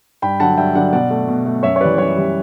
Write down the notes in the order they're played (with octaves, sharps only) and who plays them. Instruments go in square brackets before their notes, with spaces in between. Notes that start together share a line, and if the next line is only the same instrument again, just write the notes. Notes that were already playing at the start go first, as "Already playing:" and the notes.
[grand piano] G2 G5 B5
D3 F#3 F#5 A5
G2 E5 G5
D3 F#3 D5 F#5
B2 D5 F#5
A3
B2
A3
F#2 C#5 E5
C#5
E3 G3 B4 D5
F#2 C#5
E3 G3